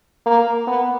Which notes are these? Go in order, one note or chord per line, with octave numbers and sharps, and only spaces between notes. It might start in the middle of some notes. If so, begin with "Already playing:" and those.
A#3
B3